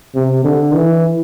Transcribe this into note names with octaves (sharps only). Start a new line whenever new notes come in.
C3
D3
E3